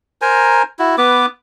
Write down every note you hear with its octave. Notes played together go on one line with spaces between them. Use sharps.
A#4 C5 G#5 A#5
E4 F#4
B3 B4 D6